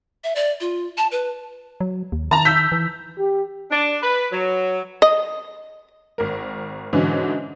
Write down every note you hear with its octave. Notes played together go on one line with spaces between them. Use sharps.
E5
D5
F4
A5
B4
F#3
D#2
D#3 A5 A#5
E6 G6 B6
E3
G4
D4
B4
F#3
D#5
G#1 A#4
G#2 B2 D3 E3 C#4